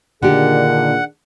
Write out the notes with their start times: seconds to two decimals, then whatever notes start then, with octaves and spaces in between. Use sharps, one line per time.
0.22 A#2 D3 D#3 D4 G4 G#4 F#5